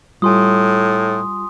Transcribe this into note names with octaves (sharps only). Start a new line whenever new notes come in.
A2 G3 F4 G#5 C6 D#6